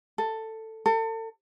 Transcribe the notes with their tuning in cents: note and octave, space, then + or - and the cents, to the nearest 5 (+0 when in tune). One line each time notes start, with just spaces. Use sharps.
A4 +10
A4 +35